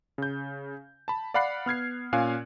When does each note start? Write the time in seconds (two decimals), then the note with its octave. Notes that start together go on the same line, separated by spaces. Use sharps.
0.18 C#3 G6
1.08 A5 B5
1.34 D5 F5 F#5 B5 F#6 C7
1.66 B3 F6 G#6 C7
2.13 A#2 C#4 F5 G#5 F#6